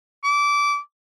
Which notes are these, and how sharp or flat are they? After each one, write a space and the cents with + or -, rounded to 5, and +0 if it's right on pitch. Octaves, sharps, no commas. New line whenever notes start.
D6 -20